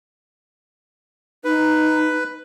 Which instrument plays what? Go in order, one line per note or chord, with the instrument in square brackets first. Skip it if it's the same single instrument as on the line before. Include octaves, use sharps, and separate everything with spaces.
[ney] D#4 [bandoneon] B4